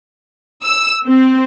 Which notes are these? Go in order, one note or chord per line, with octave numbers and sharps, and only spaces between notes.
E6
C4